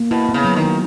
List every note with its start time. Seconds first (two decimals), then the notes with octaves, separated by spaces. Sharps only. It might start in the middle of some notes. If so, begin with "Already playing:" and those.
Already playing: A#3
0.11 B2 E4
0.29 B3
0.34 C#3
0.44 F#3
0.56 D#3
0.63 F#3